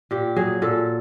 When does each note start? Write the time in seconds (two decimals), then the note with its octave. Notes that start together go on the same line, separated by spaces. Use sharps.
0.11 A#2 G4
0.36 F#3 G#4
0.62 A#2 A4